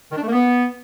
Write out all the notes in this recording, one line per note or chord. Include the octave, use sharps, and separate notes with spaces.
D#3
D4
A3
A#3
B3